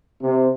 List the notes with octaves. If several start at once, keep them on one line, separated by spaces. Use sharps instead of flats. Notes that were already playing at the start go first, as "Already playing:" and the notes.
C3